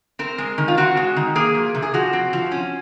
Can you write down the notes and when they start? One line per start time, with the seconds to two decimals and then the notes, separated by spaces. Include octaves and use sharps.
0.19 C4 A#4
0.38 G#3
0.58 D#3
0.68 F4
0.77 C4 F#4
0.97 G#3
1.16 D#3
1.36 A#3 G#4
1.55 F3
1.75 C3
1.82 G#4
1.94 F3 F#4
2.13 C4
2.33 F3
2.52 C#4